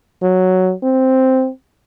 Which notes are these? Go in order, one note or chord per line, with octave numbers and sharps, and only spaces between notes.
F#3
C4